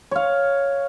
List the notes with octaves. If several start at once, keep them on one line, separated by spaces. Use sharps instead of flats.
C#5 F5